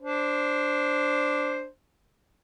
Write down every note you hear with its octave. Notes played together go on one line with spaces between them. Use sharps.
D4 C5